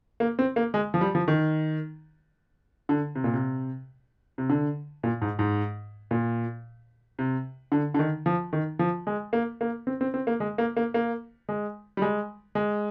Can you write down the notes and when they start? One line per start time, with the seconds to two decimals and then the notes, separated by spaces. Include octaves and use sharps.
0.20 A#3
0.39 C4
0.56 A#3
0.74 G#3
0.94 F3
1.01 G3
1.15 F3
1.28 D#3
2.89 D3
3.15 C3
3.24 A#2
3.34 C3
4.38 C3
4.49 D3
5.03 A#2
5.22 G#2
5.39 G#2
6.11 A#2
7.19 C3
7.72 D3
7.94 D3
7.99 D#3
8.26 F3
8.53 D#3
8.79 F3
9.07 G#3
9.33 A#3
9.61 A#3
9.87 C4
10.01 C4
10.14 C4
10.27 A#3
10.40 G#3
10.58 A#3
10.77 A#3
10.94 A#3
11.49 G#3
11.97 G3
12.02 G#3
12.55 G#3